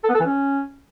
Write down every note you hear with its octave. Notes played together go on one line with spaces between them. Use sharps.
A4
B3
A4
E3
C#4